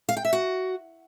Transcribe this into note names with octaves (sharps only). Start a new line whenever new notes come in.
F5
G5
E5
F#4